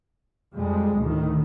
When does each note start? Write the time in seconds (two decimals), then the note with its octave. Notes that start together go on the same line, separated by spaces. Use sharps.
0.54 F2 G3 G#3
1.00 D2 A2 D#3